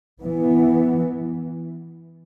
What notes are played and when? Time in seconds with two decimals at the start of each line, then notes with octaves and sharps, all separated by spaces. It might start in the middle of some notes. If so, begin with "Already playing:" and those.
0.21 E3 B3